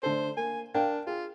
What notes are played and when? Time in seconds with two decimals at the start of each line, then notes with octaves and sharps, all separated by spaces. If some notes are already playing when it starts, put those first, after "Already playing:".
0.03 D3 A3 A4 C5
0.37 A#3 G#5
0.75 D4 A#4 F5 G5
1.07 F4 G#4